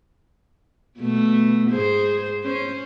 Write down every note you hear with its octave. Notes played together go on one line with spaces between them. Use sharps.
B2 A3
G#2 G#4 C5
C#4 C5